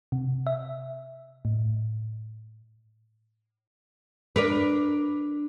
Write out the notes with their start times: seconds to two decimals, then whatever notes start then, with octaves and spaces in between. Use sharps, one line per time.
0.12 C3
0.47 E5
1.45 A2
4.36 D4 A#4 B4